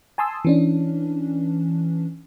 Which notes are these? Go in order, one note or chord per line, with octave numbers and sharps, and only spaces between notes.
G#5 A5 C6 D#6 E6
E3 C#4 D4